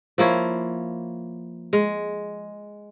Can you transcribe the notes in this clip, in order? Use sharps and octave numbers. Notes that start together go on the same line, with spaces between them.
F3 A#3 E4 C#5
G#3